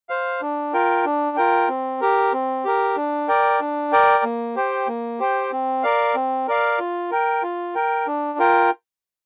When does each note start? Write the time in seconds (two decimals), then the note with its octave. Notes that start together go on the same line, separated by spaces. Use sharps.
0.09 C5 F5
0.41 D4
0.73 F4 A#4 G5
1.05 D4
1.37 F4 A#4 G5
1.69 C4
2.01 G4 A#4
2.33 C4
2.65 G4 A#4
2.96 D4
3.28 A#4 D5 G5
3.60 D4
3.92 A#4 D5 G5
4.24 A#3
4.56 G4 C5 G5
4.88 A#3
5.19 G4 C5 G5
5.51 C4
5.83 A#4 D5 F5
6.15 C4
6.47 A#4 D5 F5
6.79 F4
7.11 A#4 G5
7.43 F4
7.75 A#4 G5
8.07 D4
8.38 F4 A#4 G5